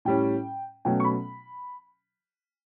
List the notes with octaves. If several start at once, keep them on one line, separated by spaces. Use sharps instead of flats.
A2 G3 C#4 G5
B2 F#3 A3 C#4 G5
C#6
B5